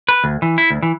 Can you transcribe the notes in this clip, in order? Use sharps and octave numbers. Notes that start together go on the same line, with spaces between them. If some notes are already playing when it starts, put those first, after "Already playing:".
B4
D2
E3
E4
D2
E3